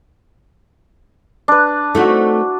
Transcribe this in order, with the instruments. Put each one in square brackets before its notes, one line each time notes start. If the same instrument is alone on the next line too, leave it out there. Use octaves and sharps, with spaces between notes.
[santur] D4 B4
[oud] A3 C4 D#4 [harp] E4 F#4